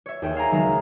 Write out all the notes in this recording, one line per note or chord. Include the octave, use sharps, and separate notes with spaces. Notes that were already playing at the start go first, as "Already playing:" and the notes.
C#5 E5
D#2 G#4 E5 G5
E5 F5 G#5 A#5
C#2 D#3 F#3 G#3 A#5